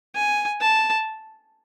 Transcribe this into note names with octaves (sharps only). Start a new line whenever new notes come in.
G#5
A5